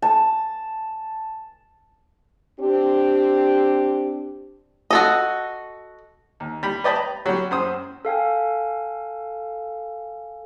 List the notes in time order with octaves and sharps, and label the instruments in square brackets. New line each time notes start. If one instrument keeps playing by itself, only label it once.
[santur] A5
[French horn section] C4 D4 G4
[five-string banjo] F#4 A4 D#5
[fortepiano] D#2
G3 B5
B4 D5 D#5 G5 A5 B5
A#5
F#3 G3
F#2 C5 D#6
[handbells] A4 F5 G5 G#5